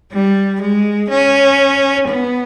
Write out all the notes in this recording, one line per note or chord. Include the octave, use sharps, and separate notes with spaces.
G3
G#3
C#4
B3